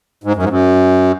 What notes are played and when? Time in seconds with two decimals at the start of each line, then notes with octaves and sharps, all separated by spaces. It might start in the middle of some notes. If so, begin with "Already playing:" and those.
0.24 G#2
0.36 F#2
0.43 G#2
0.49 F#2